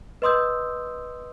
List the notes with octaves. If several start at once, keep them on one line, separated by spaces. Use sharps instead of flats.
B4 D#5 C6 D#6 E6 G6